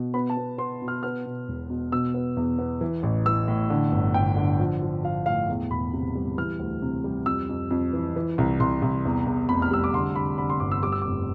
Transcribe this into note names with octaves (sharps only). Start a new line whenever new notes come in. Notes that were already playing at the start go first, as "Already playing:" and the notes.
Already playing: B2
B3 B5
A5
B3
B3 C6
B2
F6
B3 F6
B2
E1
B2
B2 E6
B3
E2
B3
E3
A1
E3 E6
A2
D3
G1
G1 G5
D3
F3
F3
F3 F5
A2 F5
E2
E1 B5
C3
G3
E3 F6
D2
C3
G3
F2 E6
F2
F2
E3
E3
C2
C2 C6
C2
E2
E2
F1 B5
F6
G3 E6
D6
D3 C6
D3 B5
D3 B5
C6
G1 D6
E6
G3 D6
E6
F1 D6